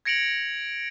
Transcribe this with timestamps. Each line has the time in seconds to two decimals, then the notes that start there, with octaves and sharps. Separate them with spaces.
0.05 G#6 A#6 C#7 D7 F7 F#7